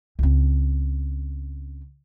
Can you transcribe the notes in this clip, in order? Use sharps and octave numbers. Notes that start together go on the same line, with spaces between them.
C#2 C4